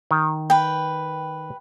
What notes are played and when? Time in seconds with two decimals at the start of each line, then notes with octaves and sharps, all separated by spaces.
0.11 D#3
0.50 B4 G5